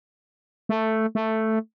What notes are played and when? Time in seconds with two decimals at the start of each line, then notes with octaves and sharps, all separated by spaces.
0.69 A3
1.15 A3